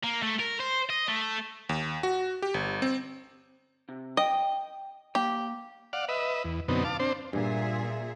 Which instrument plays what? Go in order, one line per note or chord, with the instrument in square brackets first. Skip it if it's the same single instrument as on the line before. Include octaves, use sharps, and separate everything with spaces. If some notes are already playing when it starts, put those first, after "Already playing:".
[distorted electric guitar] A#3
A3
A#4
C5
D#5
A3
[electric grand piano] D#2
F#4
G4
G1
C4
[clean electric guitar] C3
[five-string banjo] D#5 [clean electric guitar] G5
[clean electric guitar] A#3 [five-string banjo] G4
[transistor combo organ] D5 F5 F#5
B4 D#5 E5
E2
F#2 B2 D3 B3 C4 D#4
F5 A5 D6
C4 D4 C5
[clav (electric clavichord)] G2 [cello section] A#2 G#4 E5